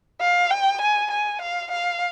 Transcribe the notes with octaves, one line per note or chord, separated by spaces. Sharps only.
F5
G5
G#5
G#5
F5
F5